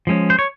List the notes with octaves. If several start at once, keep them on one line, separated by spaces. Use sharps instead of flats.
F3 G#3 C#4
C5
C#5